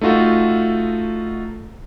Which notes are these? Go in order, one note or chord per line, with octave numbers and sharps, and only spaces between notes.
A3 D#4 F4 F#4 A4